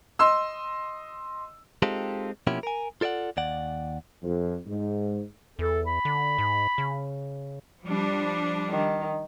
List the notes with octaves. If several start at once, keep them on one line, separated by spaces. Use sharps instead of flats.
D#5 C6 E6
G#3 C4 D#4 F4 G4 A4
B2 F3 A#3 C#4 E4 G4
A#4 G#5
F4 A4 D5 E5 F#5
D#2 D5 F#5
F2
G#2
E2 A4
B5
D3
G#2
C#3
F3 G3 D4
D#3